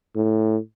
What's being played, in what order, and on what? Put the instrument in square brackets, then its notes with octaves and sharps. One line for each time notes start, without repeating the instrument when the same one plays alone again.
[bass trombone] A2